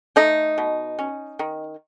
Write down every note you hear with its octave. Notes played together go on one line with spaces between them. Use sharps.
A3 D#4
B2
C#4
D#3